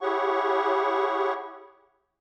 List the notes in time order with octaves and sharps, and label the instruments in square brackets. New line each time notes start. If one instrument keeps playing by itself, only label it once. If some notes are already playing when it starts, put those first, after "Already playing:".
[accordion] E4 G4 G#4 C#5 F#5 C#6